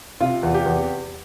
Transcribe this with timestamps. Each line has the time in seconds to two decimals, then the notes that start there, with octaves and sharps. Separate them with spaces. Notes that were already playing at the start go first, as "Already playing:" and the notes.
0.20 C3 F4
0.43 E2
0.54 G4
0.66 E2